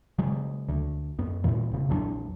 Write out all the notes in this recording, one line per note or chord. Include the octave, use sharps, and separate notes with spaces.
C#3 F#3 G#3
D2
F#2 B3
E2 A#2 E3
E1 C#3
A#1 E2 F#3 D4